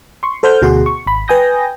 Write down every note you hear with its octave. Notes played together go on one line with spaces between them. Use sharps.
C6 C#6
A4 C5 F#5 F6 G6
D2 B2 F#4 G#4 F#5 C6
C#6
G#1 B5
B4 G5 G#5 D#6 G6 A#6